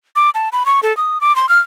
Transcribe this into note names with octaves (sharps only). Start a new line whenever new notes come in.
D6
A5
B5
C#6
A4
D#6
D6
C6
F6